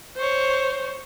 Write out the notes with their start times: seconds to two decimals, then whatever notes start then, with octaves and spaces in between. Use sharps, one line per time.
0.17 C5 C#5